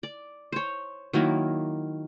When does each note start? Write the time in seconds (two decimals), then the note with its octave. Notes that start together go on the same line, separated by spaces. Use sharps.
0.03 D5
0.52 C5 C#5
1.13 D#3 F#3 A#3 E4